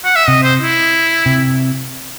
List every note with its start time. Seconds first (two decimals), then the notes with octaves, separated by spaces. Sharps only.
0.05 F#5
0.16 E5
0.28 C3 D#5
0.43 C5
0.60 E4
1.26 C3